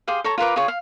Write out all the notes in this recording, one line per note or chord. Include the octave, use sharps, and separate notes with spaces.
G4 G#4 C5 F5
A4 C#5 A#5
F4 A#4 B4 D6
F4 G#4 C#5
F5